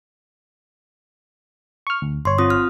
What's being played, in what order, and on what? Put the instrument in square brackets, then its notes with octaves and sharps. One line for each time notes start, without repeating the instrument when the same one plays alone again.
[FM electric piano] C#6 F6
D2
[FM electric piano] G1 C#5 [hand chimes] C6
[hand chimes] C4 F4 D#6
F6